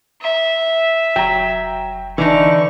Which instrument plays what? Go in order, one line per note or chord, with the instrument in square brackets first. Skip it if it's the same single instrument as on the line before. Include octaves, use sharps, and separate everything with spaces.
[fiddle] E5
[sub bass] F1 [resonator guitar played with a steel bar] F#3 [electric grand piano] G5 A#5
[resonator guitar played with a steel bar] D3 D4 D#4 [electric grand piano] E3 [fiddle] C#6